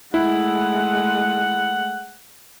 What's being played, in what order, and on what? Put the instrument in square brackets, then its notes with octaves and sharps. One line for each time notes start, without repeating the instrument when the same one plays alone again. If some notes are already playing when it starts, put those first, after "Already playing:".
[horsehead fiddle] G#3 A3 [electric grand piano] E4 [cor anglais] F#5